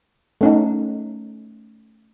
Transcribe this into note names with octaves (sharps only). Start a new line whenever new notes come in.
A3 C#4 D#4